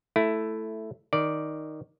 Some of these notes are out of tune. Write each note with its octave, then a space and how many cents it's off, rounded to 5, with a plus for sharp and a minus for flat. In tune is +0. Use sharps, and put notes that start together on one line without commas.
A3 +0 E4 +5
D#3 +0 D5 +0